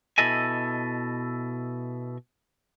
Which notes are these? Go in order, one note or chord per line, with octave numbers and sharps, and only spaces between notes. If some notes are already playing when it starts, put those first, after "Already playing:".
B2 E4 A4 D#5 G#5